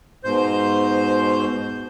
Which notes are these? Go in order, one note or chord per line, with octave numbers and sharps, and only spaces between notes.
G#2 B2 C5 G6